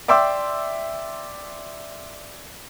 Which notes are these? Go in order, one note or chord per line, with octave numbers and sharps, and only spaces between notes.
D5 E5 G5 C6 D6 E6